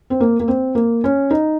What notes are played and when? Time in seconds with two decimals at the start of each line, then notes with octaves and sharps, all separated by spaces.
0.10 C4
0.20 A#3
0.40 A#3
0.48 C4
0.75 A#3
1.04 C#4
1.31 D#4